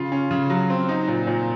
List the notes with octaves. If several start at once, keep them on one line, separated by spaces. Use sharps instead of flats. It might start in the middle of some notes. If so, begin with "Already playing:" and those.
Already playing: C#3 F4
C#4
C#3
F#3
C4
D#4
A#2
A#2